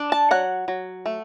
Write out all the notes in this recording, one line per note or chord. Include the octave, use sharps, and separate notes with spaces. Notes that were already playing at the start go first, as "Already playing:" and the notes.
Already playing: D4
A5
F#3 F#5
F#3
A3